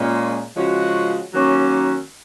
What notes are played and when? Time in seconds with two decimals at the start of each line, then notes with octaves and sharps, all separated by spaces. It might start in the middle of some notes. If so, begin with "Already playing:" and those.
Already playing: A#2 G#3 C#4
0.56 C#3 F3 G#3 C#4 F#4
1.33 D#3 F#3 A#3 C#4